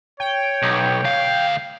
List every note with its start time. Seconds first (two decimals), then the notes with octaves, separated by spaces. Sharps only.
0.20 C#5 G5
0.62 B1
1.04 D2 F5